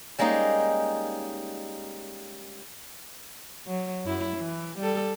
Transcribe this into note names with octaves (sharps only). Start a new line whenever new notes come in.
G3 G#3 A#3 C#4 D#4
F#3
F#2 E4
E3
G3 A4